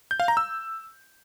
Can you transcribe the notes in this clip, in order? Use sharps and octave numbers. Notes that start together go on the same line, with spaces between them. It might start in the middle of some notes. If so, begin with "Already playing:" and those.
G6
F5
A#5
E6